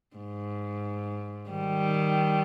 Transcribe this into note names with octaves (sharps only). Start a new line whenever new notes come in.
G#2
D#3 G3